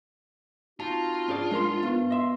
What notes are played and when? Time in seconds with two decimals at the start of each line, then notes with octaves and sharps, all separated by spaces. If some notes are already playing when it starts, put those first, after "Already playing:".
0.80 C4 D#4 F4 F#4 A5
1.28 G#2 C#4 D4 G#4 D5
1.51 G#3 A#4 C6
1.83 B3
2.10 D#5 E5 C6